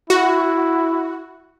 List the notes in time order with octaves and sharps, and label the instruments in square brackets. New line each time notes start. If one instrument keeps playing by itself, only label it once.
[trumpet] E4 [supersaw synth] F#4